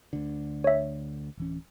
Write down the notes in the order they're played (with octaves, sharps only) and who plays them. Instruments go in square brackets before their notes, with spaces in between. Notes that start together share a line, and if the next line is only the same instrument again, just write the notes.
[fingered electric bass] D2 D3
[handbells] C#5 E5
[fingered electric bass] D1 E3 C#4